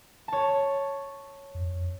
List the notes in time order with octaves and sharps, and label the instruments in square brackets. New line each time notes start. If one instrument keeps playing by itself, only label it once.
[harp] C#5 A5
[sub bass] F2